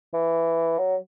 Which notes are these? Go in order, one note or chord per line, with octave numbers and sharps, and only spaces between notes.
E3
F#3